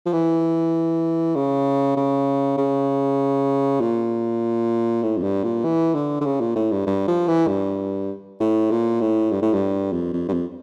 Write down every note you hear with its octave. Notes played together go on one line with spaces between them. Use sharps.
F3
E3
C#3
C#3
C#3
A#2
A2
F2
G2
A#2
E3
D3
D3
C#3
A#2
A2
G2
G2
F3
E3
G2
A2
A#2
A2
G2
A2
G2
F2
F2
G2
F2